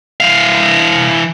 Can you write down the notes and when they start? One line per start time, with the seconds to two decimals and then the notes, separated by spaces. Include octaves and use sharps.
0.20 E3 F5